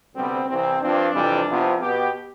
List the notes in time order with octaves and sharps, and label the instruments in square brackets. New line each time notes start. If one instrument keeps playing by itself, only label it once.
[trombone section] D2 C3 G3 B3 C4
C2 C3 E3 C4
G2 F3 C4 D4
F2 C3 E3 G3
C2 C3 F3 B3
B2 B3 G4